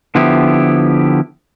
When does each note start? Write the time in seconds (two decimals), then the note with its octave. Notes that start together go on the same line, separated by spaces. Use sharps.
0.15 D3 F3 B3 E4 G4